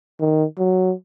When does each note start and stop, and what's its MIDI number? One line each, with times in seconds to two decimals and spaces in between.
0.20 0.45 51
0.59 0.93 54